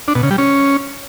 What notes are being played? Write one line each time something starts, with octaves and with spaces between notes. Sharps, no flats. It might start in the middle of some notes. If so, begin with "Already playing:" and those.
D4
B2
C#3
G3
C#4